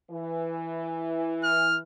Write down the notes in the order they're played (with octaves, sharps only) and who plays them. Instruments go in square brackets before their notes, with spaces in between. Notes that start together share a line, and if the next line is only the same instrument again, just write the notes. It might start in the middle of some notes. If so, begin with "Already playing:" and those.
[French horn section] E3
[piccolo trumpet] F6